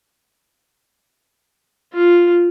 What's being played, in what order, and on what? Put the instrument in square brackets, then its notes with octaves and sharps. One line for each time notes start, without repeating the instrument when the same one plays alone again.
[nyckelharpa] F4